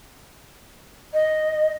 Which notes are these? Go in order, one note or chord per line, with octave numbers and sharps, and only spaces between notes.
D#5